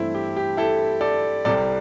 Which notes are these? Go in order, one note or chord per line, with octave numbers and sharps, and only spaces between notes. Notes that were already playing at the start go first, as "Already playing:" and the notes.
Already playing: G2 E3 A3 C4 E4
G4
G4
E4 A4
A4 D5
C2 C3 G3 A4 D5